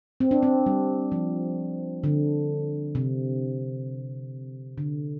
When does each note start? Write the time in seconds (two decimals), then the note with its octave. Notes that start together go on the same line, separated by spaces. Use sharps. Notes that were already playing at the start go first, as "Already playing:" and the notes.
0.20 C4
0.31 D4
0.43 C4
0.66 G3
1.12 F3
2.04 D3
2.95 C3
4.78 D3